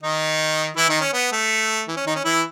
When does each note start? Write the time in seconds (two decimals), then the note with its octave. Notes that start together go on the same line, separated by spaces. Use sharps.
0.03 D#3 D#4
0.77 E3 E4
0.89 D#3 D#4
1.01 C#4
1.13 B3
1.32 A3
1.88 E3
1.97 C#4
2.06 D#3 D#4
2.16 C#4
2.25 E3 E4